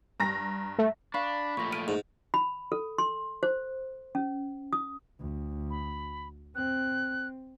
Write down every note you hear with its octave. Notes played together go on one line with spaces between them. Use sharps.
G2 A#5 A#6
A3
D4 F5 B5 C#6
A#2 F3 A3 C#6 A#6
F6 D7 D#7
G#2
B5
A4
C6
C5
C#4
D#6
D2
B5
C4 F#6